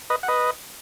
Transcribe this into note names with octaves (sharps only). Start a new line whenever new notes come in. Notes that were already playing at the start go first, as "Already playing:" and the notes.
B4 D#5
F#5
B4 D#5